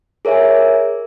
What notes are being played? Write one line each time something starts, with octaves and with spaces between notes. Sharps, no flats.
G#4 A#4 C#5 E5 G#5